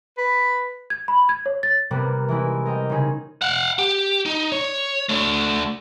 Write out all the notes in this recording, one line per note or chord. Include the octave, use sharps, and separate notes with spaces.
B4
G#6
B5
G#6
C#5
A6
C3 G3 A#3 B3 A#4
E3 G#3 C4 E4
A#4 D#5 G5
C#3 C4 C#4 D#4 G#4
F5 F#5
G4
D#4
C#5
D3 A3